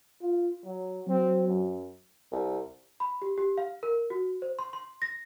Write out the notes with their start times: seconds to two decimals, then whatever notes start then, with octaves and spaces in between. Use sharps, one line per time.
0.21 F4
0.65 F#3
1.07 F#3 C4
1.48 F#2
2.32 C2
3.00 B5
3.22 G4
3.38 G4
3.58 F5
3.83 A#4
4.10 F#4
4.42 C5
4.59 C6
4.73 C6
5.02 A#6